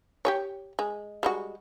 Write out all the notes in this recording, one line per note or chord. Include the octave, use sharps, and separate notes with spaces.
G4 G#4 C#5
G#3
G3 G#3 F#4